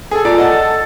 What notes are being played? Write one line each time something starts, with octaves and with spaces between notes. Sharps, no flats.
G#4 A4 G#5
A#2 D5 A#5
D#5 F#5 A5